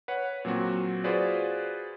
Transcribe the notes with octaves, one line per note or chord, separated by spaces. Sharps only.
B4 C#5 F#5
A#2 F#3 C4 F#4
F4 F#4 G#4 B4 C5 D5